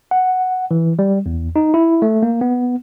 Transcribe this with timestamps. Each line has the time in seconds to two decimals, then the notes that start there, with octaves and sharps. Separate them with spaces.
0.11 F#5
0.71 E3
0.99 G3
1.26 E2
1.56 D#4
1.74 E4
2.02 A3
2.23 A#3
2.41 B3